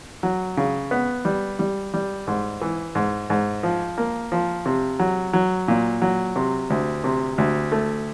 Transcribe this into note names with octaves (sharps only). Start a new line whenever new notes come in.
F#3
C#3
B3
G3
G3
G3
G#2
E3
G#2
G#2
F3
A#3
F3
C3
F#3
F#3
A#2
F#3
C3
D2
C3
D2
A3